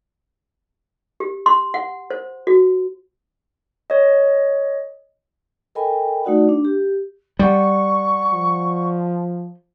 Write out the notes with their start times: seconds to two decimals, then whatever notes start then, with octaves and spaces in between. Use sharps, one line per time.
1.20 G4
1.46 C6
1.74 F#5
2.10 C5
2.47 F#4
3.90 C#5 D#5
5.75 A4 A#4 D#5 G5 G#5 B5
6.24 A3 D#4 F#4 D5 F#5
6.49 D4
6.65 G4
7.39 G3 D5 F#5 C#6
8.33 F3